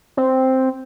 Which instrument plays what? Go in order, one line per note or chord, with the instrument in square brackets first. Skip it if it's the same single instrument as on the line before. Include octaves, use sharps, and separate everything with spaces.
[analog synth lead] C4